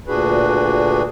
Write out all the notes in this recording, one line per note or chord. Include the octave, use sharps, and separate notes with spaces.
D2 A#2 D4 F#4 G#4 B4